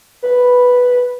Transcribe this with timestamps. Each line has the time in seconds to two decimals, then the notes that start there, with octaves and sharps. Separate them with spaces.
0.23 B4